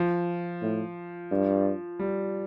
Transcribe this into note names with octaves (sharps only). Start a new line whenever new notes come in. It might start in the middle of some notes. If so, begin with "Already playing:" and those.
Already playing: F3
A2
G2
G3